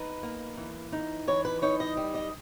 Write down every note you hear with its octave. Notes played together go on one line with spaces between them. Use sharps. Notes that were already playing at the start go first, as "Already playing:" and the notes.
Already playing: D#4 B4
A#3
E3
D#4
E3 C#5
B4
D#4 C#5
D#5
G3
D#5